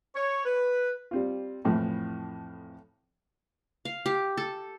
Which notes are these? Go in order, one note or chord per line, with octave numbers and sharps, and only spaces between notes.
C#5
B4
G3 C4 F4
F2 A2 E3 F3
F5
G4
A4